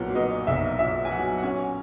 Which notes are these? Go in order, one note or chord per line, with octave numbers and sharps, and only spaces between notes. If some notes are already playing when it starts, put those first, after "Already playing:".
Already playing: B1 A#2 F#3 B3 F#5
B3 D#5
B1 E5
A#2 E5
G#5
F#3 F#5
F#5
C#4 G#5